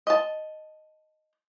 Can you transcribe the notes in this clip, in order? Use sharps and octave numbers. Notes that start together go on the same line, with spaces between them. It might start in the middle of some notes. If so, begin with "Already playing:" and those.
D#5 A5